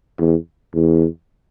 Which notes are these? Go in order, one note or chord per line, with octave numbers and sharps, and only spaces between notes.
E2
E2